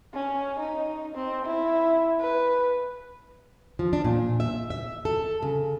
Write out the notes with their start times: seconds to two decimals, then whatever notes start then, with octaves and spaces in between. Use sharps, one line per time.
0.14 C#4
0.59 D#4
1.15 C4
1.46 E4
2.20 B4
3.79 F3
3.93 D4
4.04 A#2
4.40 E5
4.70 E5
5.05 A4
5.42 C#3